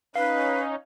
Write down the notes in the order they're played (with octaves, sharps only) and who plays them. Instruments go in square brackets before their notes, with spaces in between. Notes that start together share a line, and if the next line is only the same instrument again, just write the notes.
[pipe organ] C#4 D#4 [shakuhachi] B4 [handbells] F5